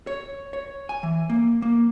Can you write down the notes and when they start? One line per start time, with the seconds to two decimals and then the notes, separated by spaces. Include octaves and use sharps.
0.07 C#5
0.53 C#5
0.89 G#5
1.03 E3
1.30 A#3
1.62 A#3